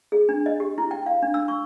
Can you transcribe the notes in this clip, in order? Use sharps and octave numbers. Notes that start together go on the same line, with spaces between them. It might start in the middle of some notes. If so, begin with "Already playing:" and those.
G#4
D4
D#5
G4
E4
G5
F5
D4
E6
C#6